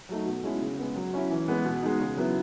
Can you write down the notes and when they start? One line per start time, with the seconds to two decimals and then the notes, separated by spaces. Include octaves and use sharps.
0.09 F#3 A3 D#4
0.26 B2
0.43 G#3 C#4 E4
0.61 C#3
0.78 G#3 B3
0.96 F#3
1.13 C#4 E4
1.30 E3
1.48 G#3 B3
1.65 B2
1.82 G#3 D#4
1.99 C#3
2.17 F#3 B3 E4